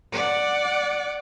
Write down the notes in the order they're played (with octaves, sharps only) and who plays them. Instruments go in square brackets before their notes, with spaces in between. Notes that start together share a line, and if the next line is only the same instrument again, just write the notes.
[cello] D5 F#5